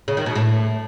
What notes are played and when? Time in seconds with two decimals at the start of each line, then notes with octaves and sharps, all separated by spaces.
0.08 C#3
0.17 D#3
0.26 B2
0.35 A2